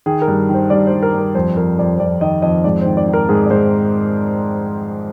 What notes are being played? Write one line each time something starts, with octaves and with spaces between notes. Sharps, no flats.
D#3 G#4
A#4
G2
D#3
C5
G2 D5
C5
G2
A#4
G2
A#4
F2 C5
F2 A#4
F2 D5
C5
F2 D5
D#3 D#5
F2 D#5
G#2 D5
C5
D#3
D5
D#3
A#4
G#2 G#4
D5
G#2 C5